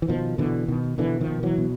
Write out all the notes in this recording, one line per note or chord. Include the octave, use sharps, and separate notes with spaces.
E3
B2 D#3 F3
B2 D3 E3
B2 D#3
B2 D3 E3
D#3 F3
B2
E3 F#3
B2